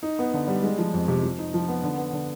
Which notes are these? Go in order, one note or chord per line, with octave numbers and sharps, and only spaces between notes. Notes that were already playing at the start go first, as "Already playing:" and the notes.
D#4
B3
D3
G3
G#3
F3
F2
C3
F3
D#4
F3
B3
D3
B3
D3